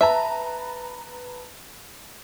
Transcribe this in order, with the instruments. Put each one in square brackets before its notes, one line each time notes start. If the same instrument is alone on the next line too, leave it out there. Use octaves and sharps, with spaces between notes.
[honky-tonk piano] B4 A5 A#5 [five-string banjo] E5